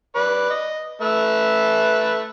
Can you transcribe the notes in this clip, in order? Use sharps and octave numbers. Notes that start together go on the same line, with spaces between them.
B4 D5
D#5
A3 B4 E5